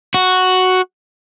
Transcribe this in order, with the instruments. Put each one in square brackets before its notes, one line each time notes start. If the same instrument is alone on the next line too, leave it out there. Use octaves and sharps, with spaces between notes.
[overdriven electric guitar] F#4